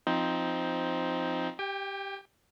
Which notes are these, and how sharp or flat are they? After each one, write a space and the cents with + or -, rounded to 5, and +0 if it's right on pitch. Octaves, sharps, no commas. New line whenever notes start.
F3 +0 C4 +0 D#4 +10
G4 +0 G5 +35